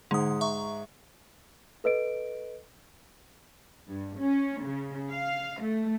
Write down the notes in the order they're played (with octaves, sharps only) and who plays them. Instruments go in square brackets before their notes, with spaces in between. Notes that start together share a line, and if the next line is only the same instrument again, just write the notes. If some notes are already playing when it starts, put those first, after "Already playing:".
[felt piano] G#2 [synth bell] D3 D#6
[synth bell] E5 A#5 C#6
[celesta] A4 B4 D#5 D7
[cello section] G2
C#4
C#3
F5
A3